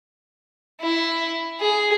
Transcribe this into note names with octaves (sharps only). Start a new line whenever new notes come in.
E4
G#4